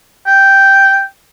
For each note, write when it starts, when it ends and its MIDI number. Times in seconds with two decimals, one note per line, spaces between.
0.27 1.03 79